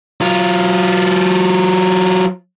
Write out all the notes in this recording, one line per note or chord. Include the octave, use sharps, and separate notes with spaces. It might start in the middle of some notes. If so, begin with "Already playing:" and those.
F#3 F4